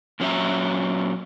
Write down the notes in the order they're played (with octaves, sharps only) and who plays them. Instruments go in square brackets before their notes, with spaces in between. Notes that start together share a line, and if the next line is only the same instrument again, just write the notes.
[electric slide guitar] A#2 F#3 C#4 F#4 E5 A#5